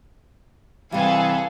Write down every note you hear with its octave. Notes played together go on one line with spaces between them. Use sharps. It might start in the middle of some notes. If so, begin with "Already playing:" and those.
C3 E3 G3 G#4 A4 F5 G#5